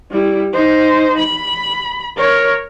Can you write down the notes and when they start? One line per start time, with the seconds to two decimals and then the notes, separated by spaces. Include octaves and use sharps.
0.11 G3 E4
0.53 D#4 C5
1.18 B5
2.17 A#4 C#5